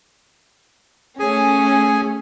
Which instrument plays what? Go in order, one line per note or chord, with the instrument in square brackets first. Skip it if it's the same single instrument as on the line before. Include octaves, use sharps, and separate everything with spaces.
[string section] A3 C#4 [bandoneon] G#4 G#5